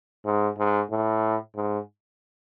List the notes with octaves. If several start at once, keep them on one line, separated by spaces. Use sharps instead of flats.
G#2
G#2
A2
G#2